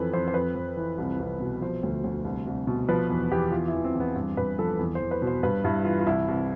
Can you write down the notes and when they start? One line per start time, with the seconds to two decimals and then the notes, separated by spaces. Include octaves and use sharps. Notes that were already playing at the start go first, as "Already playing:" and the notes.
Already playing: F2 E3 A4 B4
0.13 F2 C5
0.28 C5
0.34 F2 B4
0.55 F2
0.77 E3
0.98 C2
1.19 C2
1.40 B2
1.62 F3 C5
1.83 D2
2.04 D2
2.25 C2
2.47 C2
2.67 B2
2.89 F3 B4
3.10 E2
3.32 E2 G4
3.52 E3 F4
3.68 E4
3.74 E2
3.84 C4
3.95 E2
4.00 B3
4.15 G2 C4
4.37 G2 B4
4.58 F3 A4
4.79 E2
4.95 E2 C5
5.11 B4
5.22 B2
5.27 C5
5.43 G2 B4
5.64 G2 E4
5.85 E3 F4
6.00 F4
6.06 C2 E4
6.28 C2